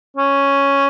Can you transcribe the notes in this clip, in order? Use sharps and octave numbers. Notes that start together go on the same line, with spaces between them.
C#4